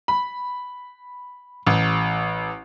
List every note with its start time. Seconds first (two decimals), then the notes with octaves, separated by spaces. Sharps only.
0.08 B5
1.67 A1